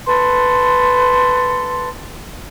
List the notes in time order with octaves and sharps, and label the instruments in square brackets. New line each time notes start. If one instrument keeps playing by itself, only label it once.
[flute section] A4 B4 C6